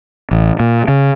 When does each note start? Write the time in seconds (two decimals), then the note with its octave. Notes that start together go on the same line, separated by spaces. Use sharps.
0.31 A1
0.60 A#2
0.88 C#3